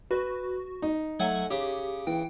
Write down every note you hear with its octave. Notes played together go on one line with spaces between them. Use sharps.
F#4 B4
D#4
F#3 A3 F#5 G#5
C#3 G4
E3 G5